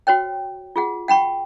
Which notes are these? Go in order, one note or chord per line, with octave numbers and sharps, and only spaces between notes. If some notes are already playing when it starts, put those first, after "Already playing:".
F#4 C5 C#5 G5
F4 G#4 F#5
F#5 G5 B5 C#6